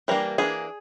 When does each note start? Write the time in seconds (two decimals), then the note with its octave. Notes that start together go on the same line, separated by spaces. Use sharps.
0.08 E3 G3 A#3 D4 A#4
0.38 E3 G3 A#3 D4 G#4